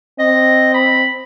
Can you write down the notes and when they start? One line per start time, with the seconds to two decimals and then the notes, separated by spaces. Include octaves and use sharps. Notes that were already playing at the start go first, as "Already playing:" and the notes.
0.19 C4 D#5
0.74 B5